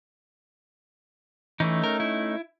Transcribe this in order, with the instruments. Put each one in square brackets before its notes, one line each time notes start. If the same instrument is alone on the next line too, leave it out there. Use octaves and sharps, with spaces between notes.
[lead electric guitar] E3 [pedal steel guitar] A3 C#4 D#4
[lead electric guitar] A#4
E4